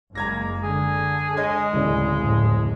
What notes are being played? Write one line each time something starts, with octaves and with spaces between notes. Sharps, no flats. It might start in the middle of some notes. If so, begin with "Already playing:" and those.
F#1 G#3 A#3 A#5 G#6 A#6
D3 G#4
G#3 C#5 D#5 G#5
D1 C#3 D5
F1 A2 C3